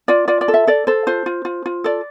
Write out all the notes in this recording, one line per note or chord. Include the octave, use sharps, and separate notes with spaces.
F4 D5
F4 D5
D5
A4
E5
A4 D5
A4 C5
F4 C5
F4
F4
F4
A4 D5